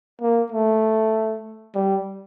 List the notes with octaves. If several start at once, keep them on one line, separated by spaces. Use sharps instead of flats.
A#3
A3
G3